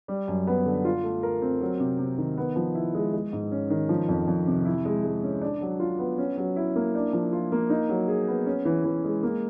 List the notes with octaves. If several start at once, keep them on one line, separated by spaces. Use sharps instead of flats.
G3
F#2
B3
D3
F4
A3
A#4
C4
F#3
C3
C3
D#3
B3
F3
E4
G#3
G#3
G#2
C#4
D#3
F3
F2
F2
C3
E4
G#3
G#3
C#4
D4
F#3
F4
B3
C#4
F#3
E4
A#3
D4
F3
F4
A#3
D#4
F#3
G#4
B3
C#4
E3
E3
G#3
A#3